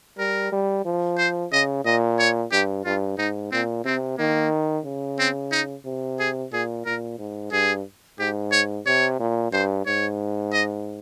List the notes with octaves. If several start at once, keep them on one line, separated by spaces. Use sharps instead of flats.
G3 A#4
G3
F3
C5
C#3 D#5
A#2 D#5
C#5
G2 G4
G2 F4
G#2 D#4
A#2 C4
C3 C4
D#3 A#3
C#3
C4
D#4
C3
G#4
A#2 G#4
A#2 A#4
G#2
G2 G#4
G#2 G4
C#5
C3 C#5
A#2
G2 C5
G#2 C#5
D#5